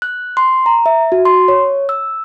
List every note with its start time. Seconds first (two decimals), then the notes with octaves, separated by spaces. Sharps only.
0.02 F#6
0.37 C6
0.66 A#5
0.86 E5
1.12 F#4
1.25 C6
1.48 C#5
1.89 E6